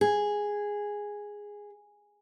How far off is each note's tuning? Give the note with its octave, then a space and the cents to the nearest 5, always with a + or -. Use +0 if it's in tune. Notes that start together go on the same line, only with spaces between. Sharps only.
G#4 -5